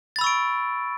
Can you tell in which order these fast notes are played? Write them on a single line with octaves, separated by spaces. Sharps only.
A6 B5 E6 C#6 D7